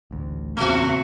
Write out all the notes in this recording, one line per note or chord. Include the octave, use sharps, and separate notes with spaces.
A1 D2
E2 A#2 C#3 A3 C4 F#4